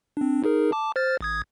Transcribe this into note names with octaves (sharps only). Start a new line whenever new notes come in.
C4 D4
D#4 G#4 A#4
A5 D6
C5 F6 A6
A1 D#6 G#6